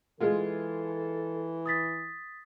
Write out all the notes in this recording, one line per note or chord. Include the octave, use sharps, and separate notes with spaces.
E3 G#3 F4 A4
D#6 A6 B6